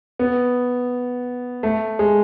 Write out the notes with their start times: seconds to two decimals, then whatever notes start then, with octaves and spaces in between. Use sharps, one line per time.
0.19 B3
1.63 A3
1.99 G#3